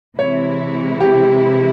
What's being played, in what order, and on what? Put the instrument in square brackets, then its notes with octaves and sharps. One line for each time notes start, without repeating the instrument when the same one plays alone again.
[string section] C3 E3 G#3 E4 [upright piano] C#5
[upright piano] G4